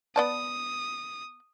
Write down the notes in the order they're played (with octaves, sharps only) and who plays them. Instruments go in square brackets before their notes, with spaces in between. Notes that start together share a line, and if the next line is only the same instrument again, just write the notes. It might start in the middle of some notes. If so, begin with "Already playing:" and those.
[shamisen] B3 D5 A5 [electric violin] D#6